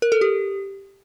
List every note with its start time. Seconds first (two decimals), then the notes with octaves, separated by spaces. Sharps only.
0.02 A#4
0.12 A4
0.21 G4